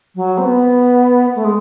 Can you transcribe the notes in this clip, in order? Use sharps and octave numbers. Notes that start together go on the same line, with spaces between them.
F#3
C4
B3
A3
G#3